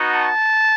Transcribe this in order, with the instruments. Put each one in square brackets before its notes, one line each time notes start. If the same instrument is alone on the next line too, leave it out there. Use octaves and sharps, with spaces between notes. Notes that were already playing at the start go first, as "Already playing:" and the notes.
Already playing: [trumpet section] B3 D#4 F#4
A5